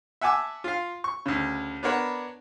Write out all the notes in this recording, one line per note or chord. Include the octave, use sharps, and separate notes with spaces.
E5 F#5 G#5 A5 D6 E6
F4 F5
C#6
D2 C#3
B3 D4 A#4 C#5 F#5 B5